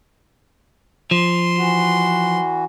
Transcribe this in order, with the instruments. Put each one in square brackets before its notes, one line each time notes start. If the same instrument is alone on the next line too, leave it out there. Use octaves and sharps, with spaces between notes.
[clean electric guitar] F3 [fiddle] C6
[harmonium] E3 F#4